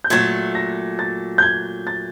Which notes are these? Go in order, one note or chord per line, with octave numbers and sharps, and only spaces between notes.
G6
A#2 F#3 A3 G#6
A#6
A6
G6
G#6
A6